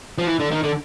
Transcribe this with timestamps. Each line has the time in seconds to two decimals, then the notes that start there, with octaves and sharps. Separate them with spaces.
0.18 F3
0.27 E3
0.39 D3
0.51 D#3
0.63 D3